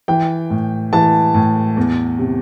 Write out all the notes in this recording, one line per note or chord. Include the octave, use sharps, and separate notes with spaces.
E3 G5
A2
E3 A5
A2
E2
C3